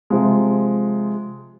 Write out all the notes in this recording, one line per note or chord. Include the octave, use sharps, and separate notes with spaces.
C3 F3 G#3